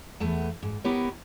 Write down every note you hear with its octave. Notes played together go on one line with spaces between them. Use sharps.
E2 A3 B3
G#2
B3 E4 G4 A#4 B4 C#5